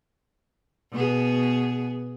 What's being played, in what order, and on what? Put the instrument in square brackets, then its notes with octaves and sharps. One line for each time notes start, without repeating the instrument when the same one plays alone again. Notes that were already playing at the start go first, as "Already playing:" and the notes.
[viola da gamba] B2 B3 G#4